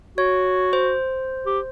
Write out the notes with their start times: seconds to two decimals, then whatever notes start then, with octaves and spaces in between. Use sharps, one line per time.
0.18 F#4 C#5
0.73 C5
1.46 G4